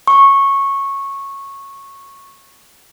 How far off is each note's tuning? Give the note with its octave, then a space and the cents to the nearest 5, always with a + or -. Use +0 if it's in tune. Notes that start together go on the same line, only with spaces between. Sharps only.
C#6 -10